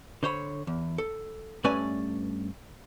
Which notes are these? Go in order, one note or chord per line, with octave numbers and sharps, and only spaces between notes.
D3 C5 C#5 B5
E2
A4
G2 A3 C#4 B4 D5 G#5